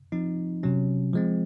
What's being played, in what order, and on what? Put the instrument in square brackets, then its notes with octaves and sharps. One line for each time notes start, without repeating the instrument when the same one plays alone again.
[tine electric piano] F3 C4 D#4
C3 F#3 C#4
F3 G#3 C4